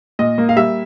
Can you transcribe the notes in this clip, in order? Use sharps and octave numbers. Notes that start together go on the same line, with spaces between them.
A#2 D#5
A#3
F5
G3 E5